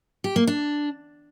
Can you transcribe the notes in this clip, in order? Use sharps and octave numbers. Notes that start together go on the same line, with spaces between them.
G4
A#3
D4